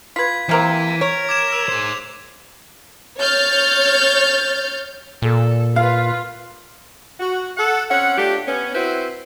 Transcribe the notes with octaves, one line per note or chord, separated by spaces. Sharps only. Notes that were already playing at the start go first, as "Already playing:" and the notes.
F4 B4 G#6 B6
C3 E3 A#3 C4
A#4 C#5
D6 G#6 E7
E6 F7
G#4 C5
C#5 F6 G6 A6
A#2 A4
F4 B4 F5
F#4
A4 F#5
C4 C#4 F#5
A3 D4 F4 G4
B3 C#4
C4 E4 F#4 B4 C5